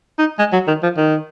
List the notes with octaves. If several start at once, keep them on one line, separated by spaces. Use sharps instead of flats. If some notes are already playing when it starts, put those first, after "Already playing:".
D#4
G#3
F#3
D#3
F3
D#3